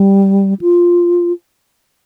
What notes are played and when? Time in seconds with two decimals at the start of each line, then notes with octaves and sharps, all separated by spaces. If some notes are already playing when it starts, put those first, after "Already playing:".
Already playing: G3
0.61 F4